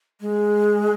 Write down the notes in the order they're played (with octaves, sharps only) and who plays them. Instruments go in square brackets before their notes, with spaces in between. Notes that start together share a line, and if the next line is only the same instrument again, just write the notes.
[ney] G#3